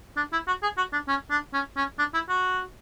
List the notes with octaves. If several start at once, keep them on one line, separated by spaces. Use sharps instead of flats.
D4
E4
F#4
G#4
F#4
D4
C#4
D4
C#4
C#4
D4
E4
F#4